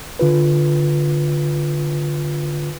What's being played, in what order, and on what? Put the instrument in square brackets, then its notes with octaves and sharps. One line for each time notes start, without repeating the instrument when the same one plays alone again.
[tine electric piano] D3 F4 B4